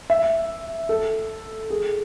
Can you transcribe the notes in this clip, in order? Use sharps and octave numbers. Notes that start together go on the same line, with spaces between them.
E5
A4
G#4